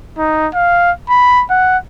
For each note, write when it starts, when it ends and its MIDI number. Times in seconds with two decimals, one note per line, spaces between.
0.19 0.48 63
0.54 0.91 77
1.09 1.44 83
1.50 1.78 78